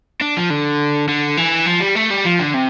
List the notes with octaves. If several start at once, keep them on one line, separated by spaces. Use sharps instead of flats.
D4
F3
D3
D3
E3
F3
G3
A3
G3
F3
D3
C3